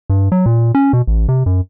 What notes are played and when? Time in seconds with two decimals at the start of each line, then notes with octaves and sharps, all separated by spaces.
0.10 G2
0.32 F#3
0.46 A#2
0.75 C#4
0.93 B2
1.07 A1
1.28 C3
1.46 F#2